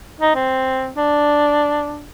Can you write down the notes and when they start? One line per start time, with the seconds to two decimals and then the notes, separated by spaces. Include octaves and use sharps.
0.20 D#4
0.36 C4
0.97 D4